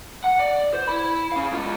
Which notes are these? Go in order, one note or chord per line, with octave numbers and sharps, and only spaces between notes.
F#5
D5
C5
E4 B5
C#4 F5
G#2 F4